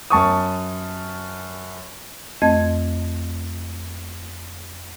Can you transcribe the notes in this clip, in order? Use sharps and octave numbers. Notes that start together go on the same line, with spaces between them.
F#2 A5 C#6 D#6
F2 A3 C4 D#5 A5 G#6